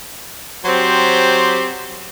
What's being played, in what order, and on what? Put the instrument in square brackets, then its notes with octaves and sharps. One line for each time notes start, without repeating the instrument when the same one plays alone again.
[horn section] F#3 C4 G4 C5